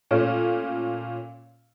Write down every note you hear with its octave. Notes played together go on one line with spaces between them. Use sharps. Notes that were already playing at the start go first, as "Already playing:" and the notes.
A#2 A3 C#4